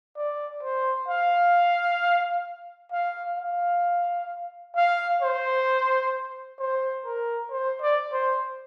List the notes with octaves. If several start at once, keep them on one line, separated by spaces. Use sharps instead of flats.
D5
C5
F5
F5
F5
F5
C5
C5
A#4
C5
D5
C5